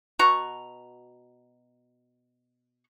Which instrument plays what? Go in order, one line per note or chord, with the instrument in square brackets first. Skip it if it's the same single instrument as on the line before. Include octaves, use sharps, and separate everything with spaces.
[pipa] B2 F#4 A#5 C#6